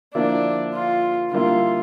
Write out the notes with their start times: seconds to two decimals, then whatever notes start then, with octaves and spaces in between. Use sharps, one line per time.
0.14 D3 F3 A#3 D4 E4
0.74 F4
1.32 D3 G3 A#3 E4 F4